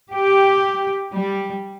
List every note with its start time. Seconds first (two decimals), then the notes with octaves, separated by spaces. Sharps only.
0.13 G4
1.13 G3